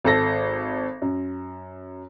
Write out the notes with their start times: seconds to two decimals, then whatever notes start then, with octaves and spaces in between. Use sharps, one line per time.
0.04 G#1 A4 A#6
1.02 F#2